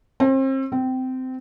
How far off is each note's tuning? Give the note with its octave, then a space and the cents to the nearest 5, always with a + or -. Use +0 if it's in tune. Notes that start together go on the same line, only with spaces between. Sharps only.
C4 +35
C4 -20